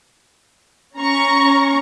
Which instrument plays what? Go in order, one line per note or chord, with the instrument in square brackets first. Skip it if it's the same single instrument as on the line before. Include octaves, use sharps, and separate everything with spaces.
[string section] C#4 A#5 C#6